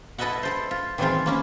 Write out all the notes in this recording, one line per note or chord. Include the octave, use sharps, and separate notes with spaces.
E4 A4 B4 D#5 E5 F#5
E4 A4 C5
F4
D#3 E3 F#3 G#3 C4 F4
A#3 C#4 E4